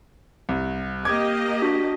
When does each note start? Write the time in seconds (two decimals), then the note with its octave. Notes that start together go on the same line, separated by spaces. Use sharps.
0.49 C2
1.05 A#3 G4 D#5 D6 G#6
1.62 D4 F#4 B6